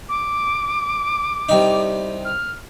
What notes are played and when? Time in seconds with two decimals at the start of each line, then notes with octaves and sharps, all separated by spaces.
0.09 D6
1.49 C2 G3 D#4
2.25 F6